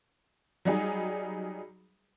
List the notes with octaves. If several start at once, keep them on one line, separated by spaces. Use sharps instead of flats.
F#3 G3 D#4 G#4